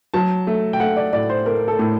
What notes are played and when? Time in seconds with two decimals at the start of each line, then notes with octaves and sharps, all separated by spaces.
0.14 F#3 A5
0.47 A3
0.73 G5
0.80 A3 F#5
0.97 D5
1.13 A2 D5
1.29 C5
1.46 A3 A#4
1.68 A4
1.79 A2